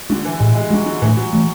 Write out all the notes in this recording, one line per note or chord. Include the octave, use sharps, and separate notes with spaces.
D3 G#3 D4
E3
A2 G#3
G#3
F#3 G#3 D4
D3
A2 E3
F#3
E3 A3